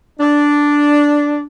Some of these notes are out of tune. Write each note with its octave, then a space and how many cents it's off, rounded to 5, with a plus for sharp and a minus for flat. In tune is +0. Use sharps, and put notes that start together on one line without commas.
D4 -5